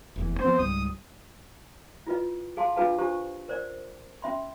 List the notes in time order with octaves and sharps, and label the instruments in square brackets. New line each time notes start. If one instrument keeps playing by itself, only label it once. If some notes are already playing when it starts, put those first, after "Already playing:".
[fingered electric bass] F1 E2 E3
[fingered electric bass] F3 B3 C4 [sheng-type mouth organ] C5
[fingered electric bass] C#2 G#2 G3 [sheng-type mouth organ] D#6
[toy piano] E4 F4 B4 D#5
G#4 F5 A5 C6
D4 F4 G#4 B4 F5 A5
D4 F4 G4 C5 A5 C#6
A#4 C5 D5
C#4 E5 B5 C6